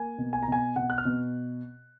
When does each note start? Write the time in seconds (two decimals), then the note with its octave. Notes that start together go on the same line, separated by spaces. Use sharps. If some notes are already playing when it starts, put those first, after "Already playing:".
Already playing: A#3 G#5
0.18 B2
0.33 G#5
0.43 A#5
0.48 B2 G#5
0.76 B2 F#5
0.90 F#6
0.98 F6
1.05 B2